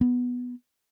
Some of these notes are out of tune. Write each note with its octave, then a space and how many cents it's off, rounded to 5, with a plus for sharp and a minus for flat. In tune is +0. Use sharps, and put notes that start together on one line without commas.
B3 +0